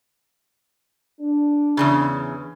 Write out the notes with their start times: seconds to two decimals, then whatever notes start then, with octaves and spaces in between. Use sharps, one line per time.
1.20 D4
1.77 E2 G2 C#3